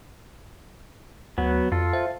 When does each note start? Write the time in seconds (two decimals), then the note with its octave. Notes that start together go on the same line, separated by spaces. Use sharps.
1.38 D2 F#3 B3
1.72 F2 F4 A4
1.93 C5 E5 F5